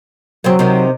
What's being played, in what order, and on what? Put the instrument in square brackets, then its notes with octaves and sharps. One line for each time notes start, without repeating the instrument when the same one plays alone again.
[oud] F#2 C#3 C4 [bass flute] F#3
[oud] C3 D#3